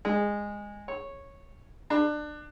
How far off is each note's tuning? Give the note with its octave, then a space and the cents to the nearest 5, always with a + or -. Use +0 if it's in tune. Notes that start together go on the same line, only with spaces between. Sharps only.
G#3 -15
C#5 -10
D4 +25